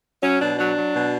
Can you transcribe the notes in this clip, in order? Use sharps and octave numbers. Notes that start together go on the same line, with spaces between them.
F#3 C#4
B2 D4
F#3 D4
F#3
B2